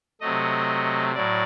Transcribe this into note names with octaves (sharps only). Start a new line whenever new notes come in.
C3 F#3 A3 D#5
A2 F#3 D5